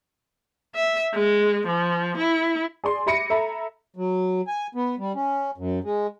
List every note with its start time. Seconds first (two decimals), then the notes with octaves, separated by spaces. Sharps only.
0.76 E5
1.14 G#3
1.68 F3
2.18 E4
2.84 G#4 D5 C6
3.06 G4 E5 B5 A#6 C#7 D#7
3.30 A4 E5 A#5 B5
3.96 F#3
4.47 G#5
4.75 B3
4.99 G3
5.15 C#4
5.58 F#2
5.84 G#3